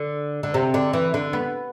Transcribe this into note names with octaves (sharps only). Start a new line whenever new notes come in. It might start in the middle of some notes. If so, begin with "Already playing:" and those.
Already playing: D3
D3
C3
D3
E3
D3
B3